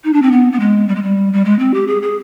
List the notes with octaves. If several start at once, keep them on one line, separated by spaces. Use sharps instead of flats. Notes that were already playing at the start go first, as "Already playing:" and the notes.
D#4
D4
C4
B3
B3
G#3
G3
G#3
G3
G3
G#3
C4
G4
G#4
G#4